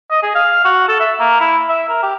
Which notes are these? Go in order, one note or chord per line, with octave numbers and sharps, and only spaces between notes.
D#5
G#4
F5
F#4
A4
E5
A#3
E4
E5
A#4
G4